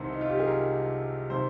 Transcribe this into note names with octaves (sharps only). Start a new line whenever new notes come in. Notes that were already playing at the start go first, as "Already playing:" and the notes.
Already playing: C2 C3 D#3 C5
D#4
F4
G4
G#4
A#4
C3 D#3 C5